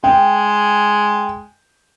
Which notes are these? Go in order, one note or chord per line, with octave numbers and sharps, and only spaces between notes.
G#3 G5